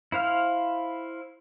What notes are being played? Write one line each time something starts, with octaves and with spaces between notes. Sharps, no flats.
E4 C5 F5 F6